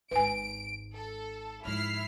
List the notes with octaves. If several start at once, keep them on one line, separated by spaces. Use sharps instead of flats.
G#1 G#2 B4 G#5 D7
A4
G#2 F3 E4 F6 C7